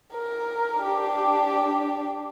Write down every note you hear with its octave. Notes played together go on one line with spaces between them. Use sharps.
A#4
D4 G4